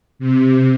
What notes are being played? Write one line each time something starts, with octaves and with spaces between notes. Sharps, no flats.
C3